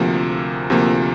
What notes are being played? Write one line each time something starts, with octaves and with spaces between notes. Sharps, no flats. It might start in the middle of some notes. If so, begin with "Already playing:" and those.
Already playing: D2 C3 F3 A#3
D2 C3 F3 A#3